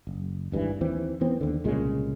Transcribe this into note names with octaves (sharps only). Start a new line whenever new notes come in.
F#1
G#1 G2 D#3 E3
D#2 E3 C4
E3 B3 C4
D#2 D3
C2 A#2 C#3 G#3